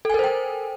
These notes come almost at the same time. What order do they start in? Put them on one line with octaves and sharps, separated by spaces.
A4 G#5 A#4 C5 G5